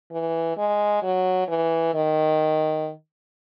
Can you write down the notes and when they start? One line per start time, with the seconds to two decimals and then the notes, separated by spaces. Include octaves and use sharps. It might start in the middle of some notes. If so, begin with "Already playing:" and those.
0.11 E3
0.57 G#3
1.02 F#3
1.48 E3
1.94 D#3